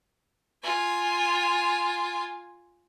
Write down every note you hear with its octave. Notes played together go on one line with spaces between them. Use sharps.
F4 G#5